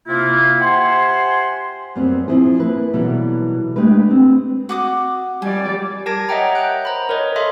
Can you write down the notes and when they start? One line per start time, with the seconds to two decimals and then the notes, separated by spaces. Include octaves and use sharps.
0.07 C3 A#3 E4 F4
0.60 G4 C5 E5 F#5 G#5 C6
1.96 F#2 G3 B3 C4 C5
2.28 F3 C4 E4 G#4
2.60 A#3 B4
2.93 B2 E3 F#3 G3 G4 A4
3.76 G#3 A3 D4 G4 B4
4.11 C4
4.69 F#4 D6 D#6
5.42 G3 D5 G#5
6.06 G4 A#4 A5 G#6 A#6 D7
6.29 C#5 D#5 E5 F#5 G5 A#5
6.55 F#6 G6
6.85 C5 A#5 B5
7.09 A#4 B4 C#5 D#5
7.36 A4 D#5 E5 B5 C6